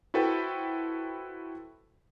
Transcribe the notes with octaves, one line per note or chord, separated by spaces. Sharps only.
E4 F#4 A4 B4 C5 G5